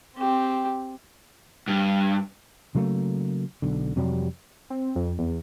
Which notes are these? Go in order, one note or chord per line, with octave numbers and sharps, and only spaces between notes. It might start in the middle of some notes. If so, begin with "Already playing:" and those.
C4 G4
G2
C#3 F#3 A3 A#3
B1 D3
F2 C3 F#3 G3
C4
F2
E2